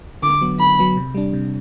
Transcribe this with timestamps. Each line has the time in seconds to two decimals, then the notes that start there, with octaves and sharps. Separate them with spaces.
0.23 D3 D6
0.41 F#3 B3
0.60 D3 B5
0.79 F#3 B3
0.97 C3
1.15 G3 D4
1.33 C3